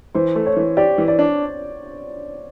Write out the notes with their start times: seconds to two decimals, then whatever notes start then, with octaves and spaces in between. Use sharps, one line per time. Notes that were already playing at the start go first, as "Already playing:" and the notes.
0.15 E3 C5
0.36 A3
0.46 C#5
0.56 E3
0.77 G4 D5
0.98 E3
1.08 D5
1.19 D4